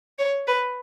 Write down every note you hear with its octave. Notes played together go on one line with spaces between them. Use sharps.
C#5
B4